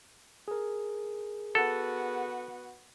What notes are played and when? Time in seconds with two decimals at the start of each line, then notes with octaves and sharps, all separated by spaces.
0.48 G#4 A#4
1.55 B3 F#4 A4